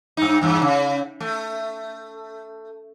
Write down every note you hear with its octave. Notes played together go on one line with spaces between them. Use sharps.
G2 D#4
E2 G2
C#3
A3